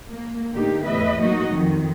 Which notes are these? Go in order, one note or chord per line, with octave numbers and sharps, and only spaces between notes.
A#3
A2 D3 A#3 D#4 G4
E2 A2 B4 D#5 E5
F#3 A#3 D#4 F#4 D#5
F2 D#3